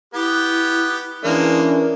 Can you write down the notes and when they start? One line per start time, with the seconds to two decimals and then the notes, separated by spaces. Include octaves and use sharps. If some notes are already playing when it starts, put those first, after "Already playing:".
0.14 B3 E4 G4
1.24 E3 G#3 A#3 C#4 D4 A#4